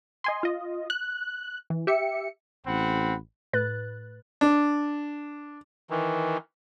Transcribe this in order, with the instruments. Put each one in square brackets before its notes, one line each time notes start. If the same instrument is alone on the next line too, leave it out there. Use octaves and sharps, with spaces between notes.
[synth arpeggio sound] D#5 G#5 C6
F4 D#5
F#6
E3
G4 E5 C#7
[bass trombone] A1 [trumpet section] C4 F#5 B5
[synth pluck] A2 B4 F#6 A6
[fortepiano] D4
[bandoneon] D#3 E3